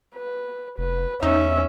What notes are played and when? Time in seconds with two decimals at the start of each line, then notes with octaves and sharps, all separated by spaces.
0.15 B4
0.78 F1 B4
1.23 E2 C#4 D#4 E5